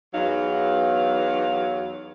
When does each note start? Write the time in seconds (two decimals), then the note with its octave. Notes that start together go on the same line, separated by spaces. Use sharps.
0.14 E2 F#3 D#4 F5